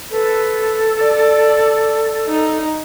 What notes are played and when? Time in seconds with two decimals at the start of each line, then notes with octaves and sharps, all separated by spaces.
0.11 A4 B4
1.01 D5
2.28 D#4